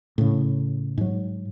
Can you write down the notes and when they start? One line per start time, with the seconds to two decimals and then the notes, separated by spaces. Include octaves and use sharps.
0.18 A2 C#3
0.98 G#2 F#3